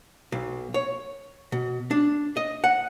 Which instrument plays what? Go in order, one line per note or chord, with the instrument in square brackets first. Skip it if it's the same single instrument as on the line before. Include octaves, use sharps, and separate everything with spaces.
[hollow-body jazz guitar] B1
C#5
B2
D4
D#5
F#5